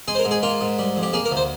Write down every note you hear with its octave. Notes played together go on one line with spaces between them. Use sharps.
G#3 G#4
C5
A#4
G#2
G#4
A#3 F4
G#2
G3
F2
G4
A#3 G#4
A#4
D2
C5